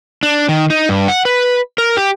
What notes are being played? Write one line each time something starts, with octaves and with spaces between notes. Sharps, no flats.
D4
D#3
D#4
G2
F#5
B4
A#4
G4